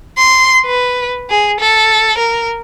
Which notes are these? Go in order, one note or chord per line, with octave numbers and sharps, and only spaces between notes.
C6
B4
G#4
A4
A#4